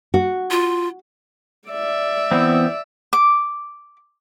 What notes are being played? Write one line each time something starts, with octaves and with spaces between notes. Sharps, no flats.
F#4
F4
D5 E5
E3 B3 C4
D6